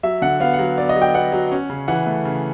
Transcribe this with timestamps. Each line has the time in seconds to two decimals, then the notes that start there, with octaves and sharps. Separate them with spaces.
0.03 F#3 E5
0.22 D3 F#5
0.40 B3 F5
0.54 F#5
0.59 F#3
0.78 B3 D5
0.89 D#5
0.96 F#3
1.02 G5
1.14 B3 F#5
1.32 F#3
1.52 C#4
1.70 C#3
1.88 E3 F#5
2.06 A3
2.25 C#3